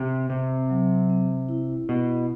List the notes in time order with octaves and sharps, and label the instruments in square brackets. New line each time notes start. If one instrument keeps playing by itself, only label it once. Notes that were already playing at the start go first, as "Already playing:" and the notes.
Already playing: [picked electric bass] C3 [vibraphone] C4
[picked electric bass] C3 [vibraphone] C4
[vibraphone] F#3
C4
E4
[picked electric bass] B2 [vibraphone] E4